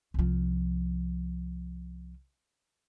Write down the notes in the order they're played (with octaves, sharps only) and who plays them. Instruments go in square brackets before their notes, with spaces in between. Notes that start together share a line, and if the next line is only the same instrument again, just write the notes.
[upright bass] C2 F3